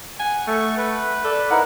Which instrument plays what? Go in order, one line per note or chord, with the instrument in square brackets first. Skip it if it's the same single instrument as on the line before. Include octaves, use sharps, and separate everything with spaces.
[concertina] F#5 [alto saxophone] G#5
[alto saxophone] A3 [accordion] C#6
[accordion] B4
[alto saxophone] A4 [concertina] D5
[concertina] D#4 E4 A#4 [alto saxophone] F#5